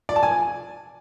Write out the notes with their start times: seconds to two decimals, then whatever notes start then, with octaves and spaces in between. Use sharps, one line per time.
0.09 D5
0.16 A5
0.23 G#5